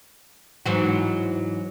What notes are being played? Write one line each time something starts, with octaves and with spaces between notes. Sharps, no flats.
G#2 E3 F#3